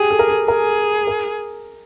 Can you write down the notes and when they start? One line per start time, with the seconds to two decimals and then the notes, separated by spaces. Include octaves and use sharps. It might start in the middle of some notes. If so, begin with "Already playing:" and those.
Already playing: G4 G#4
0.11 A4
0.19 A#4
0.30 A4
0.48 G#4 A#4
1.07 A#4